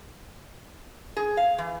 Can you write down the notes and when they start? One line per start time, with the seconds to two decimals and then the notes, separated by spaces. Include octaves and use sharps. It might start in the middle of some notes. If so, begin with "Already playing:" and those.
1.17 G#4
1.37 F5
1.58 E3